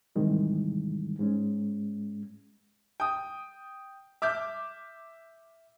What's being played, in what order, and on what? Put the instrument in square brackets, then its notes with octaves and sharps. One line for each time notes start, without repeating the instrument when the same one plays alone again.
[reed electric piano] G#2 C3 D#3 E3 G3 G#3
G#2 G#3 C#4
[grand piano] G5 D#6
E5 D6 F6 G6